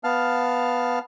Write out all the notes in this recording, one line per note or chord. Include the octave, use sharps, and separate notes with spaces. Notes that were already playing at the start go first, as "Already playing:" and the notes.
B3 F5 A5 F6